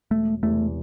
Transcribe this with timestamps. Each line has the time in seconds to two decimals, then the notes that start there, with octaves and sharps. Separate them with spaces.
0.11 E1 A3
0.43 E2 C3 A3